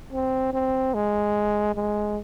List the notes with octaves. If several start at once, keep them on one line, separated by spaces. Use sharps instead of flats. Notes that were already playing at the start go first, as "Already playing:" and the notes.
C4
C4
G#3
G#3